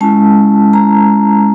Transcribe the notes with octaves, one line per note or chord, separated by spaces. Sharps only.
G#3 C#4 E4 A5
A#5